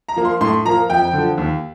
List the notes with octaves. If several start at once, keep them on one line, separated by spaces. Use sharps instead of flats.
A#5
F3 A#3
C6
A2 C6
F3 A#3 A#5
F2 G5
D3 F3
D#2